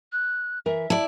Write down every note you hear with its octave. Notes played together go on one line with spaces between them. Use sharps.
F#6
E3 A#4 E5
E4 D5 A5